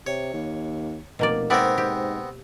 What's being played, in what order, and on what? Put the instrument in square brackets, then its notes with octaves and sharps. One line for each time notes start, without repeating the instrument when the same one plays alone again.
[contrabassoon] C3 [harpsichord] C#5
[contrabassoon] D#2
[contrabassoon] F1 [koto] B2 A#3 D5
[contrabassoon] G#2 [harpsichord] B3 C4 A#4 [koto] D5 E5
[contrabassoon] G#2 [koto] G4